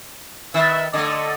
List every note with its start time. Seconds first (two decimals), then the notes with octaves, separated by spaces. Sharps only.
0.54 D#3 B4 E5
0.94 D3 A3 A4 D5 D#5